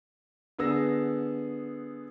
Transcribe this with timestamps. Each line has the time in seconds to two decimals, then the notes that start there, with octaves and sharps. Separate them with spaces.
0.59 D3 B3 G#4 E6 A#6